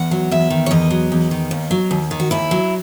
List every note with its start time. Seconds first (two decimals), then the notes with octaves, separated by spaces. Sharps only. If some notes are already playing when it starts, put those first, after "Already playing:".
Already playing: E2 F#5
0.11 F#3
0.31 E2 E5
0.50 D#3
0.66 C#5
0.71 E2 D#5
0.90 F#3
1.12 E2
1.31 D#3
1.51 D#2
1.71 F#3
1.91 D#2
2.11 D#3
2.20 F#4
2.31 D#2 E4
2.51 F#3